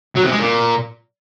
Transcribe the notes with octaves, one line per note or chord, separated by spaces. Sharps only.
F#3
C3
G#3
A#2